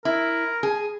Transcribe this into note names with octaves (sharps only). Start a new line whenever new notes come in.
E4 A#4
G#4